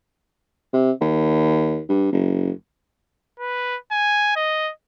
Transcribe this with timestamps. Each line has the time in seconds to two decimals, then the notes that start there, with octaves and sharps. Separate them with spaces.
0.73 C3
1.01 D#2
1.89 G2
2.12 F#1
3.40 B4
3.92 G#5
4.36 D#5